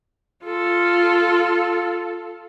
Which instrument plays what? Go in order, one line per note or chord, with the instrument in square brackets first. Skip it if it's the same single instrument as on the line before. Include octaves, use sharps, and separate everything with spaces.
[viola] F4 A4